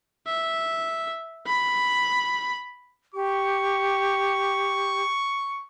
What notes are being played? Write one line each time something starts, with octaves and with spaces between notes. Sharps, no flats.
E5
B5
G4 C#6